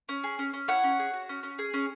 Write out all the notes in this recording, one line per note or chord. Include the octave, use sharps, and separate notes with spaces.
C#4
G#4
C#4
C#4
E4 C#5 F#5
C#4
G#4
F#4
C#4
C#4
G#4
C#4